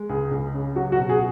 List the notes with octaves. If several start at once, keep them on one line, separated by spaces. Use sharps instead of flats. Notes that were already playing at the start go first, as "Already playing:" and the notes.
Already playing: G#3
C#2 G#4
C#2
C#3
F#3 F#4
F#4
B2
G#4